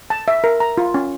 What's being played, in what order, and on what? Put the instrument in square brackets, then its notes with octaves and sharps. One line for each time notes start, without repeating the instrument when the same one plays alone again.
[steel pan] A5
E5
A#4
A#5
F4
C#4